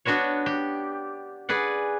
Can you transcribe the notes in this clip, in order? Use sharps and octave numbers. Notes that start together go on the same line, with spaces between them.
B3 D4 F#4 B4 C#5
G4
G#4 B4 D5 F#5